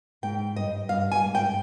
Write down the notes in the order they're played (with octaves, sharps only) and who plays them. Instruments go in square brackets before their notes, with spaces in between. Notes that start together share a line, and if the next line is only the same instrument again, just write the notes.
[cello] G#2 [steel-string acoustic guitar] G5
[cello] G2 [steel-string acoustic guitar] D#5
[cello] G2 [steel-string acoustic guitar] F5
[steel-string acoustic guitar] G#5
[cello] G#2
[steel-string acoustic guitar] G5